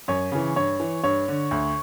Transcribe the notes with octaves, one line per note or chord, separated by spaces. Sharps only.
F#2 C#5
C#3 E3
G2 C#5
E3
G2 C#5
D3
D2